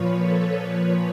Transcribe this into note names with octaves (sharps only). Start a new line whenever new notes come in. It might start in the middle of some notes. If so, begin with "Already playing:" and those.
Already playing: A#2 F3 B4 C#5
A4 B4
A#2 F3 B4 C#5